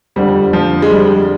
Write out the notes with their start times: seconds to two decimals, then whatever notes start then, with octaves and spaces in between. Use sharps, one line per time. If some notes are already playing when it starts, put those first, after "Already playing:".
0.16 F2 D3 G3
0.53 F3
0.82 G#3
0.91 G3